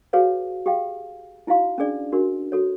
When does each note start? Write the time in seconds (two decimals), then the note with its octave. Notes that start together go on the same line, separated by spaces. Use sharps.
0.13 F#4 G#4 B4 C#5 F5
0.66 G4 G#4 F5 G5
1.47 D#4 E4 F#4 F5 C6
1.78 C#4 D4 G#4 D5
2.12 D4 F#4 A#4 C6
2.52 F#4 A4 C#5